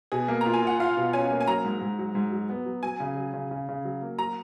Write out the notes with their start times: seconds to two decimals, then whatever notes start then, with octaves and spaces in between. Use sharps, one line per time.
0.12 B2 G#4
0.28 A#3
0.41 A#5
0.46 F4
0.54 G#5
0.63 F4 F#5
0.80 F4 F5
0.97 B2
1.13 C#4 G#5
1.30 A#3
1.41 G#5
1.47 F#3 A#5
1.64 G#2
1.81 G#2
1.99 F#3
2.15 G#2
2.32 F#3
2.50 B3
2.66 F#3
2.83 F#3 G#5
3.00 C#3
3.17 F#3
3.33 C#3
3.51 C#3
3.69 C#3
3.85 F#3
4.02 A#3
4.19 F#3 A#5